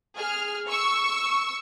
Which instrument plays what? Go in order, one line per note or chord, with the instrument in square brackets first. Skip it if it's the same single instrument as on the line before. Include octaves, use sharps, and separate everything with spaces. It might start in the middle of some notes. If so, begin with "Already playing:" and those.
[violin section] G#4 F6
C#6 E6